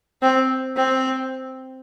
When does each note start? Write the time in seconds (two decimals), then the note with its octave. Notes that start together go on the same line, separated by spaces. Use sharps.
0.22 C4
0.76 C4